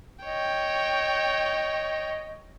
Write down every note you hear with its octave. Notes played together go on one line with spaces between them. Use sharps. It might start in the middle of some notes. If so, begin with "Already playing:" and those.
C#5 D#5 G5